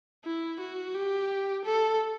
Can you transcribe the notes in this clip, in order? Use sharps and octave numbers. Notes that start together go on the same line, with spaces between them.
E4
F#4
G4
A4